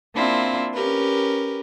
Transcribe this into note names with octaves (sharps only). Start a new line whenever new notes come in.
A#3 C4 D4 E4 F4
C#4 G4 A#4 B4